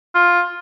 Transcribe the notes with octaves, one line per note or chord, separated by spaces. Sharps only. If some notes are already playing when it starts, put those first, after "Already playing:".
F4